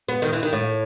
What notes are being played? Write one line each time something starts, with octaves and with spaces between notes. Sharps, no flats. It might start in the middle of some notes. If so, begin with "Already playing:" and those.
B3
D#3
E3
D#3
A2